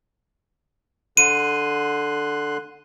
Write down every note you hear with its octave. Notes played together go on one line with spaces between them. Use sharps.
D3 C6 F#6 D#7